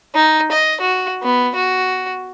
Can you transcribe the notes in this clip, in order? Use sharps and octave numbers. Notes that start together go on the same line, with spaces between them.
D#4
D#5
F#4
B3
F#4